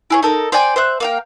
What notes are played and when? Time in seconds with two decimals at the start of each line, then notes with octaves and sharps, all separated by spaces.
0.10 E4 G#4 C#5
0.23 D#4 A4 A#4
0.52 C5 D5 G5 G#5
0.76 C5 E5 F#6
1.00 A#3 F5 G5